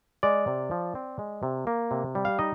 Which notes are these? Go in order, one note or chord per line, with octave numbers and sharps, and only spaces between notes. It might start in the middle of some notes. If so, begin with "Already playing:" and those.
G#3 D5
C3
F3
C4
G#3
C3
A#3
C3
G3
F5
D#4 D#5